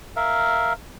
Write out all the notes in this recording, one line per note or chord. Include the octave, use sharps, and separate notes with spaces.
A#4 E5 F5